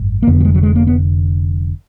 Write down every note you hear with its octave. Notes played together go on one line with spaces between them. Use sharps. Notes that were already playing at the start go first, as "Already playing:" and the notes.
Already playing: G#1 F#2
A#3
F1 F2 D3 B3
F#3
G#3
F#3
G#3
A#3
B3